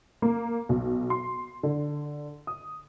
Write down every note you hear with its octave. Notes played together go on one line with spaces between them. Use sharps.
A#3
B1
C6
D3
D#6